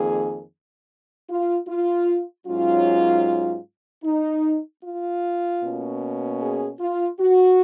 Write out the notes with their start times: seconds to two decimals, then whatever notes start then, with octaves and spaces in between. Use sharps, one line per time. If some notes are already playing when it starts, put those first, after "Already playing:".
Already playing: F2 D#3 A#3 G#4
1.30 F4
1.68 F4
2.47 G#2 F#3 C#4 F4
4.04 D#4
4.83 F4
5.63 B2 A#3 C#4
6.41 G#4
6.80 F4
7.20 F#4